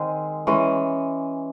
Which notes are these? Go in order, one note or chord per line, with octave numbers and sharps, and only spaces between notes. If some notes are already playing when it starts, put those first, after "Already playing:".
Already playing: D#3 G#3 C4
E3 G#3 C#4